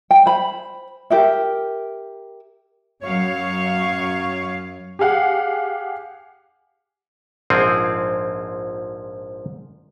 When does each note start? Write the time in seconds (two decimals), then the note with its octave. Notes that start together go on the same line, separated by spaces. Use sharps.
0.11 G5
0.26 C5 B5
1.10 G4 A#4 E5
3.02 F#2 F#3 C#5 F5
4.99 G4 G#4 F5 F#5
7.50 A#1 G#2 F3 C4 G#4